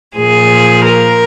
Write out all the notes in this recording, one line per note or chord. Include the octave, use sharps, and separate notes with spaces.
A#2 F3 G#4
A#4